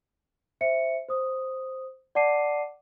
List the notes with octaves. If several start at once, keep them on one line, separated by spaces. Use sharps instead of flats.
C5 E5 C#7
C5 D#6
D5 F#5 A5 D6 C7 D#7